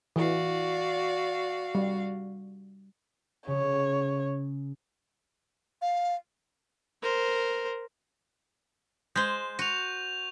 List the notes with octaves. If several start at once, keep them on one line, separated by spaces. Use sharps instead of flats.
E3 F#4 D5 F5
G3
C#3 C#5
F5
A#4 C5
G#3 C5 G6
F#4 C#6 F7